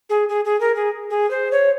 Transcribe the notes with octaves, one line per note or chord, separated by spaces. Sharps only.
G#4
G#4
G#4
A#4
G#4
G#4
C5
C#5